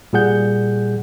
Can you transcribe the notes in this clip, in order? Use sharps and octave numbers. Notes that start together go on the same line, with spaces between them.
A#2 G3 G#4 F#5 G6